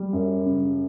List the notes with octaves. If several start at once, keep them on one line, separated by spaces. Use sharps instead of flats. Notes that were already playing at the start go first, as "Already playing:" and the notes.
Already playing: G3
F#2
C#3